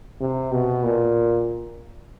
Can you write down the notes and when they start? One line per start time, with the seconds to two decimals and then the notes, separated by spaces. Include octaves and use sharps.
0.21 C3
0.52 B2
0.84 A#2